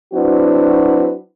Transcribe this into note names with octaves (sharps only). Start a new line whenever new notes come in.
F#3 C4 D4 E4 F#4 B4